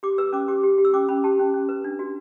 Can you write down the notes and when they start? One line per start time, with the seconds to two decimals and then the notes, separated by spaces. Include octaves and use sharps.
0.03 G4 D6
0.18 B4 E6
0.33 C#4 D6
0.48 G4 D6
0.63 G4
0.78 G4
0.85 E6
0.93 C#4 D6
1.09 C#4 B5
1.24 G4 A5
1.39 C#4
1.54 C#4
1.69 B4
1.84 D4
1.99 F#4